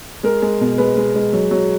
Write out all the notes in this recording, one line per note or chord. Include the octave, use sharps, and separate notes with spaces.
G#3 A#4
G#3
B2
G#3 B4
G#3
G#3
F#3
F#3